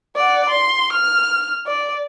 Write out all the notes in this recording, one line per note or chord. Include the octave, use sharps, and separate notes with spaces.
D5 F#5
C6
F6
D5